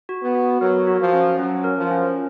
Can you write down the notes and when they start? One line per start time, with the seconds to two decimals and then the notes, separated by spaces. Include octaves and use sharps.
0.09 F#4
0.23 B3
0.35 F#4
0.61 F#3 A#4
0.87 F#4
1.00 F3
1.13 C#4
1.38 F#3 C#4
1.64 A#4
1.77 F3
1.91 C#4